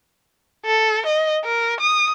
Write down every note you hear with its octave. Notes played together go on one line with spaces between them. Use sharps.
A4
D#5
A#4
D#6